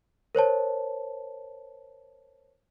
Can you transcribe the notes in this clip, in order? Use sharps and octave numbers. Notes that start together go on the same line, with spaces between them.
A#4 C5 C#5 A5